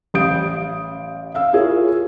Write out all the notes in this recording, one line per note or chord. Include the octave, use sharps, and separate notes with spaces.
A1 G4 F5 D#6 G6 D7
E5 F5 E6
E4 F4 G#4 A#4 C#5